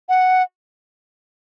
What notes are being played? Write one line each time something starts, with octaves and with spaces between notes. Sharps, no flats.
F#5